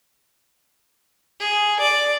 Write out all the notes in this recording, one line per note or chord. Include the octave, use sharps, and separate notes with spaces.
G#4
D5